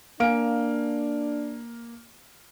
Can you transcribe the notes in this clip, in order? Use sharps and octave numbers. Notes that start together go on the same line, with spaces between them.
A#3 D4 F5 G#5 F6 D7